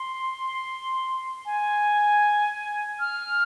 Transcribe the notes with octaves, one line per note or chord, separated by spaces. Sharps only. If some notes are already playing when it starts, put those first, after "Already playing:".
Already playing: C6
G#5
F6